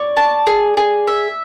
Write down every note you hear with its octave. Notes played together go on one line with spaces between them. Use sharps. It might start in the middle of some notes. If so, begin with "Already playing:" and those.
Already playing: C#5 D5
A5
G#4
G#4
E5